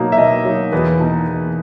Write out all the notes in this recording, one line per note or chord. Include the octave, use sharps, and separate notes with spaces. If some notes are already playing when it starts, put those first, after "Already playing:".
Already playing: B2 F#3 A#3 D#4
E5
B2 D#5
F#3 A#3 D#4
E2 B4
B2 A#3 D#4
E2